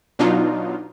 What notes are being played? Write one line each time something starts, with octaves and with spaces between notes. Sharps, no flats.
B2 F#3 D4 D#4 F4